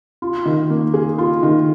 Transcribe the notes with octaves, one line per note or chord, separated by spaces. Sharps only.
F4
D#3
A#3
G#4
F4
D#3